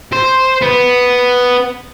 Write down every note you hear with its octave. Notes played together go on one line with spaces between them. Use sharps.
C5
B3